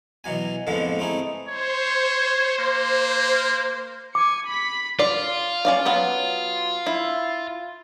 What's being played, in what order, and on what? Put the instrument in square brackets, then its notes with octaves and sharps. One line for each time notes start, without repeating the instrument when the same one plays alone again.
[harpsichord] B2 E3 F#3 G#5
F2 A2 D3 F3 G#3 B3
A3 C4 D#4 E4 G#4
[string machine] C5 [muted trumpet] C#5
[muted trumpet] A#3
[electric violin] G#5 C#7 [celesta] D6
[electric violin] B5 B6
[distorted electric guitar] F4 [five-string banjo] D5
[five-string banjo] C#4 D5 F5
F#3 B3 F#5
E4